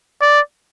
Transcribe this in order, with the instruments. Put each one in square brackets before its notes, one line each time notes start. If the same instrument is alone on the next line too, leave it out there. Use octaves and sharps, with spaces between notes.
[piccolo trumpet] D5